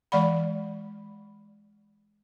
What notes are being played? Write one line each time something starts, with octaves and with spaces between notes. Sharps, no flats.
E3 G#3 D5 F#5 B5